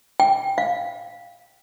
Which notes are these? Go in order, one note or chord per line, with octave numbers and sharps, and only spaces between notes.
G5
F5